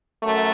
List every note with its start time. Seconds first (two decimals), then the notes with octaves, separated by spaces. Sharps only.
0.22 F#2 A3